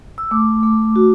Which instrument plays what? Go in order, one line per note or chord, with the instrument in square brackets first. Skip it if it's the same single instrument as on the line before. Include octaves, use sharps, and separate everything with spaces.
[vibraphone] E6
A3 D6
A3
F#4